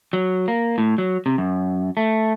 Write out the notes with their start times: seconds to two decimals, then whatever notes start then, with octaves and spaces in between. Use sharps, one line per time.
0.13 F#3
0.48 A#3
0.78 A2
0.98 F#3
1.26 C3
1.38 F#2
1.97 A3